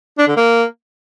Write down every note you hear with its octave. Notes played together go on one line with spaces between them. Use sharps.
D4
D3
A#3